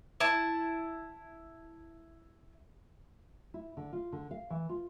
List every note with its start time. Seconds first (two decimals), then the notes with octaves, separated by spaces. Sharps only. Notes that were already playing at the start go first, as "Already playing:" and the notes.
0.20 E4 A5
3.54 E4
3.77 D3
3.93 F4
4.12 D3
4.31 F5
4.50 E3
4.69 F4